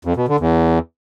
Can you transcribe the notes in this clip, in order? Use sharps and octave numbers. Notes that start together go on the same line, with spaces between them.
F2
B2
D3
E2